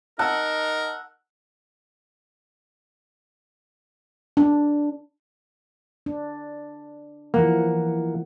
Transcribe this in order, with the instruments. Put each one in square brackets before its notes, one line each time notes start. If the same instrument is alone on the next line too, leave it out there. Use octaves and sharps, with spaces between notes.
[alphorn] D#4 [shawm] A#4 [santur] F#5 [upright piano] A5 E6
[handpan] D4
D4
[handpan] E3 F3 F#5 [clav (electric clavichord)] A#3